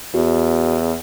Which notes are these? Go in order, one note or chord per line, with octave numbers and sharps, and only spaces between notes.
E2 F#4